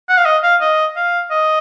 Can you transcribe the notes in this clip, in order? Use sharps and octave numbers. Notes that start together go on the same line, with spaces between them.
F#5
F5
D#5
F5
D#5
F5
D#5